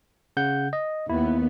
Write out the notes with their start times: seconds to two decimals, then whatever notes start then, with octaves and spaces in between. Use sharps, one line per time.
0.37 C#3 F#5 G6
0.73 D#5
1.09 D#2 B3 E4